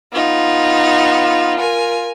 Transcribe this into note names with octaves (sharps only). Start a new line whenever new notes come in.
B3 D#4 F4
A#4 G#5